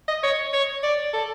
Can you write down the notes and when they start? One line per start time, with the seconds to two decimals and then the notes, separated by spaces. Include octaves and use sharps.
0.08 D#5
0.23 C#5
0.53 C#5
0.83 D5
1.13 A4